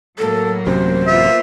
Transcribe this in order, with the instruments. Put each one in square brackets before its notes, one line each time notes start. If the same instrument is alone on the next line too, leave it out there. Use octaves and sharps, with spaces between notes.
[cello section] A2 F#3 A#3 [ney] A4
[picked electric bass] A1 F#2 C3 [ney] C5
[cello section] A#3 B3 F4 [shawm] E5